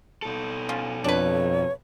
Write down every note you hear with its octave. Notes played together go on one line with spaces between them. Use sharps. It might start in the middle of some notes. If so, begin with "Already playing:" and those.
B2 A4
F3 C#4 F4
F2 D4 B4 C#5